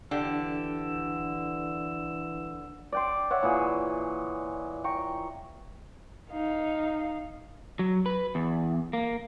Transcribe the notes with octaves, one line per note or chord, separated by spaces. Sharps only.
D3 E3 D4 G4 A4 E6
D5 G5 C6
C#5 E5 F#5
A#2 E3 G#4
G5 A#5 C#6
D#4 F5
F#3
B4
E2
A#3